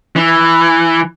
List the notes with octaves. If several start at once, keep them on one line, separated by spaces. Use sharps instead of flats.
E3